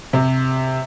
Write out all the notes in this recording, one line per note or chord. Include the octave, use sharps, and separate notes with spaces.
C3